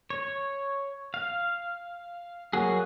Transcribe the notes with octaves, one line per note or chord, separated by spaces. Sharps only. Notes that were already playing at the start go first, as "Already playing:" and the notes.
C#5
F5
F#3 A#3 F#4 G#4